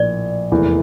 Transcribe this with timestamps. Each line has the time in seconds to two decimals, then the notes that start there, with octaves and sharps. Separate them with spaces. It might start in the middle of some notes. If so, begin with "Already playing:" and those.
Already playing: A#1 A2 F3 A#3 D5
0.51 F1 E2 E3 A#3